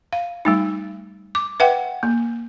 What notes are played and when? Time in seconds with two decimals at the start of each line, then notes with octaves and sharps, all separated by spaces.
0.13 F5
0.45 G3 A3 D#4
1.35 D6
1.60 B4 E5 F#5 G5
2.03 A#3